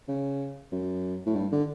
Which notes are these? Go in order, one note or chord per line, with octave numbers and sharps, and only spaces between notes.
C#3
F#2
A2
G2
D3